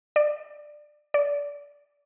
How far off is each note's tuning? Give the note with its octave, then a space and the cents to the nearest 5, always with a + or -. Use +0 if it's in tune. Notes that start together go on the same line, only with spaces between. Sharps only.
D5 +15
D5 -25